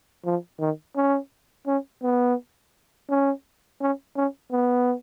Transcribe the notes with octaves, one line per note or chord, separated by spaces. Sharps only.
F3
D#3
C#4
C#4
B3
C#4
C#4
C#4
B3